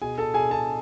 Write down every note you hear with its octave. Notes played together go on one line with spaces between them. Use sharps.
B2 G#4 G#5
A4 A5
B2 G#4 G#5
A4 A5